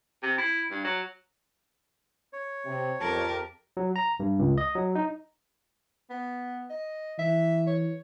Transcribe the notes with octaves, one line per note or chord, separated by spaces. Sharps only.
C3
E4
G2
F#3
C#5
C3
F2 G4 A#4 A5
F#3
A#5
G2
C#2
D#5
F#3
D#4
B3
D#5
E3 E5
C#5